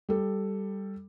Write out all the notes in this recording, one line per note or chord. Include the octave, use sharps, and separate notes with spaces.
G3 A4